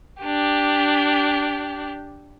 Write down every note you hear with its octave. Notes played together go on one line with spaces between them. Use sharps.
D4 G4